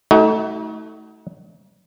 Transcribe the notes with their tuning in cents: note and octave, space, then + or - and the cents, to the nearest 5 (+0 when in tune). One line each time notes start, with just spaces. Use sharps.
A3 +0 D#4 +40 F#4 +30